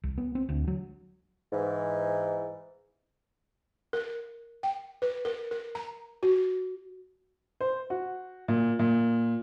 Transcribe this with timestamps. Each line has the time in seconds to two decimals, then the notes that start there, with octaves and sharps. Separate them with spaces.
0.04 C2
0.18 B3
0.35 C4
0.49 D2
0.68 F#3
1.53 G#2 E3
3.93 A#4
4.63 G5
5.02 B4
5.25 A#4
5.51 A#4
5.75 A#5
6.23 F#4
7.61 C5
7.90 F#4
8.48 A#2
8.79 A#2